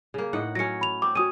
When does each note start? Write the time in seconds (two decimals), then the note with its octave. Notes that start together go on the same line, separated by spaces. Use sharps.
0.14 C#3 A#3
0.33 A2 D#4 F#5
0.55 F#3 C#4 A#6 C#7
0.81 B5 F7
1.02 C4 D6
1.15 C#4 F#4 D#6 D#7